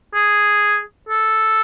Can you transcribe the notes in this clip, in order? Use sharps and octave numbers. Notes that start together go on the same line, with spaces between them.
G#4
A4